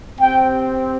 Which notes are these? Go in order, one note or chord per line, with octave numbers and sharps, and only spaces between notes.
C4 G4 G5